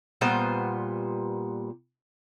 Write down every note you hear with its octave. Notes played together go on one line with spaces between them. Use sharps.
A#2 G3 B3 C5